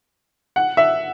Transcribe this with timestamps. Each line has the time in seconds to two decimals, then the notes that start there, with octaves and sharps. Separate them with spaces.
0.56 F#5
0.77 E5